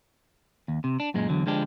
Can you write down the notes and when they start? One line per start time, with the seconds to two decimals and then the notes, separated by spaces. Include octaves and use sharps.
0.68 D#2
0.84 C3
1.00 D4
1.14 F#2 A#2 G#3
1.29 E2 D3 F#3
1.46 D3 F3 G#3 D4 G4